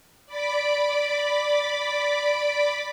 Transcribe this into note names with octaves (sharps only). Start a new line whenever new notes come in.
D5 B5 D6